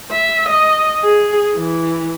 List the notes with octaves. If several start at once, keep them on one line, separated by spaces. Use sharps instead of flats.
E5
D#5
G#4
E3